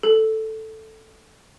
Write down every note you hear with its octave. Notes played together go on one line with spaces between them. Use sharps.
A4